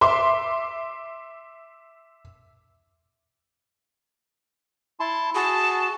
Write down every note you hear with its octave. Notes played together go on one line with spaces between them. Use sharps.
E5 C6 D6
E4 A5 C6
F#4 G#4 A5